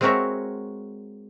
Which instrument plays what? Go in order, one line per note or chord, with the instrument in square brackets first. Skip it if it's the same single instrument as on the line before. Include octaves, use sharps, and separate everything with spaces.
[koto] G#3 C4 F#4 A#4 C#5 E5